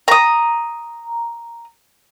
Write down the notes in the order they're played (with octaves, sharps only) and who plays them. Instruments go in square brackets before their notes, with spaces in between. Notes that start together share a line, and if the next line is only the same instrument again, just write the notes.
[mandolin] A#5 D#6